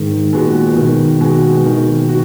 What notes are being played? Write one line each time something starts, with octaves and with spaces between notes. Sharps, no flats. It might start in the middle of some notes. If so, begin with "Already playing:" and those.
Already playing: G#2 D#3
A#2 G#3 B3 F#4
B2 D#3
G#3 B3 F#4
D#3
F#4